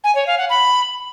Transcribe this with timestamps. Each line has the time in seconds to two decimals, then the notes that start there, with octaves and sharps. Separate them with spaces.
0.04 G#5
0.15 C#5
0.27 F5
0.38 F#5
0.50 B5